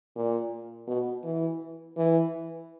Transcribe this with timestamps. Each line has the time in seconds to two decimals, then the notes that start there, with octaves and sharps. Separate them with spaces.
0.16 A#2
0.87 B2
1.24 E3
1.97 E3